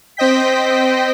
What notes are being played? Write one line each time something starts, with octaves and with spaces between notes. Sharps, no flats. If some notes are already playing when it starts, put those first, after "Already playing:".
C4 C5 D#5 G5 B6